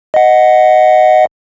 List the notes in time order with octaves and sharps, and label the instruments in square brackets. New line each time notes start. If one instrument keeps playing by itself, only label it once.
[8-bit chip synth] D#5 F#5